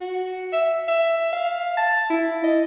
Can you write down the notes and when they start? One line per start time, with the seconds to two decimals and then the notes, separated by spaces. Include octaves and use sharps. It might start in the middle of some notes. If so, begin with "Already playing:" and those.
0.01 F#4
0.52 E5
0.88 E5
1.33 F5
1.77 A5
2.10 E4
2.44 D#5